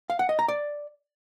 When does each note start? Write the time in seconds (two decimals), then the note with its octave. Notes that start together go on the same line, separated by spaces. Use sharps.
0.10 F5
0.19 F#5
0.29 D#5
0.39 A#5
0.48 D5